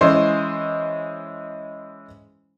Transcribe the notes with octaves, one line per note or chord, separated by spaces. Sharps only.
E3 G#3 C#4 C5